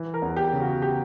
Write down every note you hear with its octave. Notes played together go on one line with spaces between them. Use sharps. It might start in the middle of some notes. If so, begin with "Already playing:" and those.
Already playing: E3
A#4
E2
G4
C#3
F#4
G4